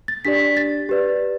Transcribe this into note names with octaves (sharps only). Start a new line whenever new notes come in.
A6
D4 G4 D5 B6
A6
G4 B4 D5